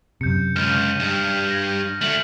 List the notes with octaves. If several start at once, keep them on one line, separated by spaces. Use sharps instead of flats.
F#2 C3 G6 C#7
C#2 F6 G6 D#7
G2
G#6 A#6
D3 A3 F6 F#7